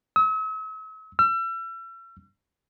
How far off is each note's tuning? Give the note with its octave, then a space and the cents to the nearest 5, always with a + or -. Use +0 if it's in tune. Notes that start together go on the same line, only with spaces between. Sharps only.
E6 -45
E6 +40